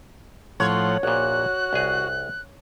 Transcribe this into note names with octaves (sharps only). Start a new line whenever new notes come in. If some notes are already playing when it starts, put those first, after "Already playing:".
A2 F3 C#5 F#5 C6
A#1 A#2 F#4 F#6
C2 G#4